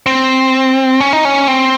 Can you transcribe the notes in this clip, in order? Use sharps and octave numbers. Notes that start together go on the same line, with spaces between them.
C4
C#4
D#4
C#4
C4